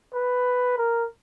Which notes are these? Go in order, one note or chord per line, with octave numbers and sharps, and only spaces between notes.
B4
A#4